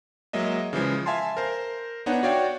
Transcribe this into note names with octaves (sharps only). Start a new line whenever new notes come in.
F#3 G#3 A#3 D#5 E5
C#3 E3 F3 G#3
E5 F5 G#5 A5 C6
A#4 C5
B3 D4 D#4 C#5 F#5
F#4 C#5 D5 F5 G5